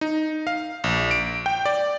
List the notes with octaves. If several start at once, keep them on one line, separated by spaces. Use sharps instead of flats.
D#4
F5
A#1
D7
G5
D5